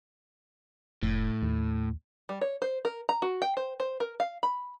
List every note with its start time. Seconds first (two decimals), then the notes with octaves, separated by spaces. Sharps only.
1.03 F1 A2
1.42 D#2
2.29 G3
2.41 C#5
2.62 C5
2.85 A#4
3.09 A#5
3.22 F#4
3.42 G5
3.57 C5
3.80 C5
4.00 A#4
4.20 F5
4.43 B5